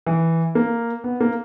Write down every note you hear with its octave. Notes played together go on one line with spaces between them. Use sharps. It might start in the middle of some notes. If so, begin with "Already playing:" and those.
E3
A#3
B3
A#3